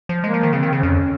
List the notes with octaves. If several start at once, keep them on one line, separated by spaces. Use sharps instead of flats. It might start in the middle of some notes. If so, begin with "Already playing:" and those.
F3
G#3 A#3
F3
D#3
C#3 C4
D#3
C#3
F2 C#4